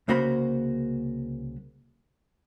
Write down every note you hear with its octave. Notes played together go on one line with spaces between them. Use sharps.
C2 C#3 A#3 F#4 C5 B5